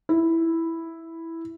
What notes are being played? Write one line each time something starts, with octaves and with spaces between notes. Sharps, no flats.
E4